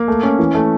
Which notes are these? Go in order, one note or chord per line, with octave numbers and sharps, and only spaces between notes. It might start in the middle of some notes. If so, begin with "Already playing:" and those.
Already playing: A#3
A3
C#4
E3
A3